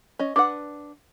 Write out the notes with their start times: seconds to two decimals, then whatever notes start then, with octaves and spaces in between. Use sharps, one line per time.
0.19 C#4 D#5
0.36 D4 B4 F#5 D6